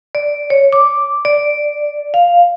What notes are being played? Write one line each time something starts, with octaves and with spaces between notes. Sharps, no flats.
D5
C#5
D6
D5
F5